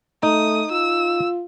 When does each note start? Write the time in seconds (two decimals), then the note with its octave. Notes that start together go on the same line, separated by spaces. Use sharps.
0.23 A3 D#4 D#6
0.71 F4 E6